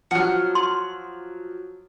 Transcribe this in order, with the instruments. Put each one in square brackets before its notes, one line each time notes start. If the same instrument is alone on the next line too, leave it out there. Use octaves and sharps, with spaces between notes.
[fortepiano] F3 F#3 [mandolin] F#5 F6
[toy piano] C6